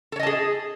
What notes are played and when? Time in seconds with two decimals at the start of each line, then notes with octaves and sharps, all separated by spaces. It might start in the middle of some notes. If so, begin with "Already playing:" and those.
0.12 A4
0.16 C#5
0.19 D#5
0.23 A5
0.27 G#4